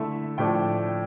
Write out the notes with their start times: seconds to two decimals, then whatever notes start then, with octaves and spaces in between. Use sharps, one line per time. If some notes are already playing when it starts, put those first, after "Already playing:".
Already playing: D3 A3 E4 E5
0.38 A2 F3 A3 D4 G5